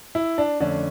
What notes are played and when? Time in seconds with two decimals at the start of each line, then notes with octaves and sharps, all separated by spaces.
0.15 E4
0.38 D4
0.60 F2 D3 A3 C#4 D4